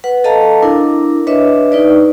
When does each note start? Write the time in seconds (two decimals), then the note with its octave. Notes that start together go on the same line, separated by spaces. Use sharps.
0.04 B4 F#5
0.24 A4 D#5 F5 A5 A#5
0.63 D4 E4 A#4
1.27 D4 B4 C#5 D#5 E5
1.72 D#4 B4 D5